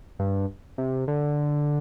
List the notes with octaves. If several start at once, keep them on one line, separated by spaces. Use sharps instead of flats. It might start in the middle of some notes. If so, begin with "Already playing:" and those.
G2
C3
D3